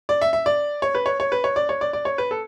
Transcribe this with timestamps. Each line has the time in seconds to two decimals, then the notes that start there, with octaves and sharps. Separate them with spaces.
0.09 D5
0.22 E5
0.33 E5
0.46 D5
0.82 C#5
0.95 B4
1.06 C#5
1.20 C#5
1.32 B4
1.44 C#5
1.56 D5
1.69 C#5
1.81 D5
1.93 D5
2.05 C#5
2.18 B4
2.31 A4